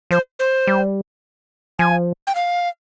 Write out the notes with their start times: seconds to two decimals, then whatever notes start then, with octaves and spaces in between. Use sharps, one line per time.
0.11 F3 C5
0.39 C5
0.67 G3
1.79 F3 G#5
2.27 G5
2.35 F5